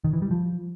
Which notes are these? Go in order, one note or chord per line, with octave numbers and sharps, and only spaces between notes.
D#3
E3
G3
F3